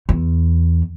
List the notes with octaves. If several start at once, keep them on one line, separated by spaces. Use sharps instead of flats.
E2